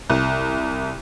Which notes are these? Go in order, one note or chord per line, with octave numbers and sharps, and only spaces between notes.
C2